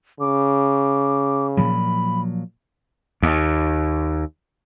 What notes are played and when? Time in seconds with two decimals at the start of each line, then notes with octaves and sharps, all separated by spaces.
0.20 C#3 D6
1.57 A#2 F3 F#3 B5
3.22 D#2